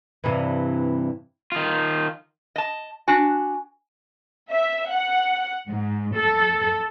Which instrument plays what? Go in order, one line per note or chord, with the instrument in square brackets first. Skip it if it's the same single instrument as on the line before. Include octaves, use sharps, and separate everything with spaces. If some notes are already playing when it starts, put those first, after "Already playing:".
[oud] G2 C3 E3
[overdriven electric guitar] D#3 F4
[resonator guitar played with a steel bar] D#5 A5
[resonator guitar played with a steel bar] D4 F#4 [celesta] G#5
[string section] E5
F#5
G#2
A4